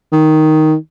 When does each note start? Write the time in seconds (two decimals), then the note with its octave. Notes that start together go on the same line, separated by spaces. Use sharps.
0.12 D#3